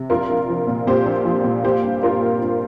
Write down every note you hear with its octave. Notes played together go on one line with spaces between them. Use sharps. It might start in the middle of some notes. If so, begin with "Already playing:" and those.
Already playing: C3
A#1 F4 A#4
A#1
F3
A#2
A#2 G4 C5
A#1
F3
A#2
A#3 G4 C5
G2
G2 F4 A#4
G2
G2